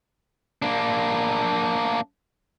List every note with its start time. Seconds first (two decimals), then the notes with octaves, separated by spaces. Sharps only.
0.62 A#3 D4